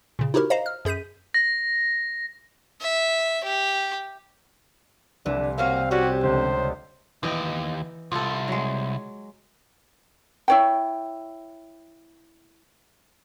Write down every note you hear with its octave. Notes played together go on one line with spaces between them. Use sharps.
A#2 C#3
D#4 E4 F#4 G4 A#4
C5 D#5 F5 A#5
F6
F#2 G#4 G6 B6 D#7
A#6
E5
G4
C2 E3 D4
A#3 C4 C#4 F#4 F5
C#4 D4 F#4 G4
C#2 C5
D#2 E3 D#5 G5
C2 F4 A4
F#3 G#3
E4 C#5 G5